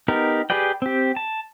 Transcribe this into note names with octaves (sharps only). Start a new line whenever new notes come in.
B3 D#4 G4 A#4
G4 G#4 B4 D5 G5
C4 G4
A5